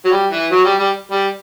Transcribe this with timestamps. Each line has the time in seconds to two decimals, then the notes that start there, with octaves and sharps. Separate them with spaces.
0.05 F#3
0.11 G3
0.31 E3
0.52 F#3
0.64 G3
0.79 G3
1.11 G3